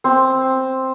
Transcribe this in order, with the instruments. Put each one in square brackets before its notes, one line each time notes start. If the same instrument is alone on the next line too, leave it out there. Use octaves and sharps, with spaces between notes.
[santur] C4